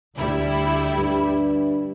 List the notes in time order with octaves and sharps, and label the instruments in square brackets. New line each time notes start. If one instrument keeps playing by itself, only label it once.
[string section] D2 G3 E4
[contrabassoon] G2